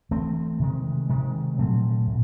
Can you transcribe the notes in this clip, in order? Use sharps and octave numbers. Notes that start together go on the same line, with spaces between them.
E3 A3 C4
C3 D#3 G#3
C3 D#3 G#3
A#2 F#3 A3 C4
A#2